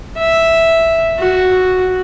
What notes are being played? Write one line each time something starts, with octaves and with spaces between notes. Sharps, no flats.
E5
F#4